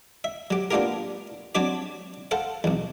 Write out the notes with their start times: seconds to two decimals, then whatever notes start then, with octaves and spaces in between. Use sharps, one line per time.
0.24 E5
0.51 F#3 G4
0.71 A#3 B3 D4 F4 G4 A#4
1.55 F#3 C4 D4 F#4 C#5 D5
2.31 A4 C5 F5 F#5
2.64 B1 E2